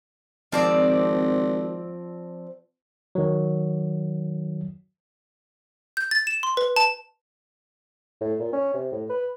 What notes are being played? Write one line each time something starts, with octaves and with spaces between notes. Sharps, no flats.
G#1 F3 C4 D5
D#3 F#3
G6
A6
E7
C6
B4
A5
A2
A#2
C#4
C3
A2
B4